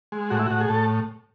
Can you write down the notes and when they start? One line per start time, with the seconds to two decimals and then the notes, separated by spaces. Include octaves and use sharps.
0.12 G#3
0.30 A2 F#4
0.39 E4
0.46 A2 F#4
0.60 G#4
0.68 A2 A4